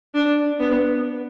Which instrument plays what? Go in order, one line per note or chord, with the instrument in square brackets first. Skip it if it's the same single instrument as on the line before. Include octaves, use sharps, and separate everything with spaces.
[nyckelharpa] D4
B3